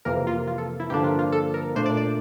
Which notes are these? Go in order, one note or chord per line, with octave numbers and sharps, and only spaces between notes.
F2 C3 E3 A#3 A#4
F4
F4
A4
E4
G2 D3 F3 A#3 D4 G4
F4
F4
A4
A#4
A#2 A3 D4 C5
D5
D5